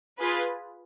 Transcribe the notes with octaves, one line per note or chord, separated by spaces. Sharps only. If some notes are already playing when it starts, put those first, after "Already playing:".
F4 G#4 B4